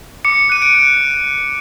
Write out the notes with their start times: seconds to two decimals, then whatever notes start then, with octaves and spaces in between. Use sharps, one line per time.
0.25 D6 C#7
0.49 F#6 D#7
0.62 D7
0.74 F#6